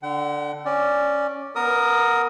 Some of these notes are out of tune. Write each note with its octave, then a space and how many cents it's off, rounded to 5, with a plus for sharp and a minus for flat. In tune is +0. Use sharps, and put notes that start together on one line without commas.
D3 +0 F#5 +45
C#4 +0 D5 +0
B3 -20 A#4 +0 D#6 +20